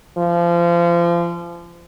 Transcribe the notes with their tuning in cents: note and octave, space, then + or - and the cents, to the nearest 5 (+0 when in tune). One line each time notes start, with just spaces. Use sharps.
F3 -30